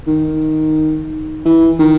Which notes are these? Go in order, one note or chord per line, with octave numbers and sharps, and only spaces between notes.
D#3
E3
D#3